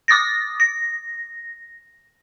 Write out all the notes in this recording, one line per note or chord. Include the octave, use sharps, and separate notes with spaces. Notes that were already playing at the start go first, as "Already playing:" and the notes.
D6 D#6 A6 A#6
A#6